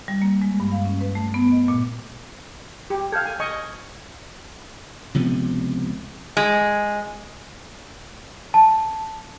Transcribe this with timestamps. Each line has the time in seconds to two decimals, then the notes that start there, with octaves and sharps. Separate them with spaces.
0.08 G3
0.22 A#3
0.42 G#3
0.60 G2
0.72 F5
0.85 C#4
1.01 B4
1.15 A3
1.34 B3
1.51 D#5
1.68 A#2
2.90 G4
3.12 A4 F5 F6 G6 G#6
3.25 G#5
3.40 D#5 G#5 C#6
5.14 C#2 C3 F3 B3
6.37 G#3
8.54 A5